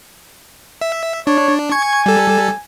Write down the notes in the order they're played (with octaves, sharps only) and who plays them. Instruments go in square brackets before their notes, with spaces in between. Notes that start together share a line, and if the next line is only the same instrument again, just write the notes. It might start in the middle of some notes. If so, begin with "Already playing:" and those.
[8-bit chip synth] E5
[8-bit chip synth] D4 [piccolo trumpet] C#5
[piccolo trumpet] G#5 [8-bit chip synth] C#6 G#6
[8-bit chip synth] G3 A4